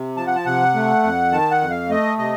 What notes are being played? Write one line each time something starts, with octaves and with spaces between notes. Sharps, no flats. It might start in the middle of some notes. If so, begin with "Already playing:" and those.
Already playing: C3
F3 A5
F#5
A5
C3 F#5
A3
F2
D#3 A5
F#5
F2
F5
A3 D#5
C3 D#5